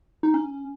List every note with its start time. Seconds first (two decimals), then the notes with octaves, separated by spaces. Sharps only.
0.23 D#4
0.34 C#4